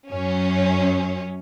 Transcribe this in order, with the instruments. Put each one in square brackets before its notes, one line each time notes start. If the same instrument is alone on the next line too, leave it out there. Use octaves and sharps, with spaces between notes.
[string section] F#2 C#4